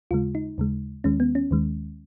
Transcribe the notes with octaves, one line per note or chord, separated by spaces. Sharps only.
D#2 C#3 G#3 F4
D#4
D#2 C#3 G#3
D#2 D#3 G#3 C#4
B3
C#4
D#2 D#3 G#3